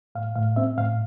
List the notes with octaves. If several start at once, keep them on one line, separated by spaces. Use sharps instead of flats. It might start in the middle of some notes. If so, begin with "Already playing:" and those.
A2 F5
A2 F5
C4 E5
A2 F5